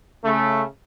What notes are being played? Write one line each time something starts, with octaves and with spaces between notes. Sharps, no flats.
C#3 A3